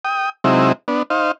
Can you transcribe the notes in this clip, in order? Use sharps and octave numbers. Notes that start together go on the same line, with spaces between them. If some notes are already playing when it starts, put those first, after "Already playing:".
G5 D#6
C3 F#3 G#3 C4 D#4 E4
B3 D4
D#4 C5 F5